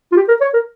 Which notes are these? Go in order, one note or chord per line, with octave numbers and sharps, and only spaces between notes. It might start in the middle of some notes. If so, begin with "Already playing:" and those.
F4
G4
A#4
C#5
A#4